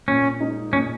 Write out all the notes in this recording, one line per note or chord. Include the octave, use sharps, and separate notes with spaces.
A#2 C#4
G#3 D#4
A#2 C#4